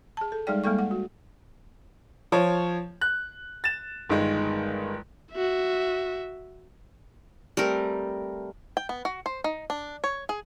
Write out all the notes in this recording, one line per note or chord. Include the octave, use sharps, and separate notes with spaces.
G#4 A5
A4
G3 G#3 D#4 G#4 D5 G5
G3 G#3 A#3 A4 G5 C#6
F#5
F#4
F3 C#5
F#6
A6 E7
G1 D#3 G#3
F#4 E5
G3 A3 C4 A#4
G5
B3
F#4
C5
D#4
D4
C#5
G#4